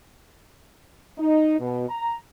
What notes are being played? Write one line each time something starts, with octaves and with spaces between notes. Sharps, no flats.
D#4
B2
A#5